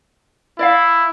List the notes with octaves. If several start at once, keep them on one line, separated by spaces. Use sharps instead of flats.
E4 D5 E5 F5